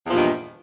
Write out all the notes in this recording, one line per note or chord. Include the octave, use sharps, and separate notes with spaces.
E2 G2 A#2 D#3 F3